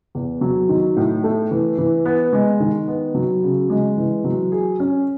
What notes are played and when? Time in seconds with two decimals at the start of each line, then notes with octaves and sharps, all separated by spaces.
0.15 E2
0.41 F#3
0.69 D#3
0.97 A2
1.24 A3
1.51 E3
1.78 E3
2.05 B3
2.33 G#3
2.60 D#3
2.87 B3
3.15 F#3
3.43 C#3
3.70 G#3
3.97 E3
4.24 F#3
4.52 G#4
4.80 C#4